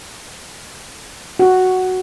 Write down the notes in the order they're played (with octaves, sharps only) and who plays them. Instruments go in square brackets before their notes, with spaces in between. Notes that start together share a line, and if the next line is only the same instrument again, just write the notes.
[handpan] F#4